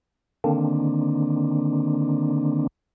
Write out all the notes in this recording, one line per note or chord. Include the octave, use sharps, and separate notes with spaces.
D3 D#3 A#3 C4 D4